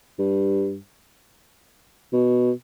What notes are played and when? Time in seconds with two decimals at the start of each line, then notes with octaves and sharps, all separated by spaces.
0.19 G2
2.13 B2